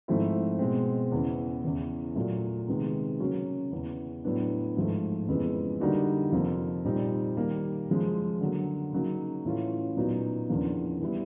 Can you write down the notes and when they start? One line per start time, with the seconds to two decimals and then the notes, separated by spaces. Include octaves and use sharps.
0.08 G#2 F3 A3 C4 E4
0.59 B2 G#3 C4
1.12 E2 C#3 E3
1.64 E2 C#3 E3
2.15 A#2 F#3 A3
2.68 C3 D#3 G#3 B3
3.20 C#3 F#3 A#3 C#4 F#4
3.72 E2 C#3 E3
4.24 A2 F#3 B3 D4
4.77 G#2 F3 A3
5.28 F2 C#3 E3 G#3 B3
5.80 D3 G3 A#3 D#4 F#4
6.32 F2 C3 F3 A#3
6.85 A#2 G3 C4 D#4
7.37 D#3 G3 A#3
7.89 F#2 C#3 F3 G#3
8.41 D3 F#3 A#3
8.93 C#3 F#3 A#3 D#4
9.45 A2 E3 A3 C#4 F4
9.97 A#2 F#3 B3 D#4 F#4
10.49 E2 C#3 F3 A#3 D4
11.00 E3 G3 B3 E4